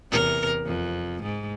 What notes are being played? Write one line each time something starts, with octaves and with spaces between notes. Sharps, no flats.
E2 C3 A#4
F2
G#2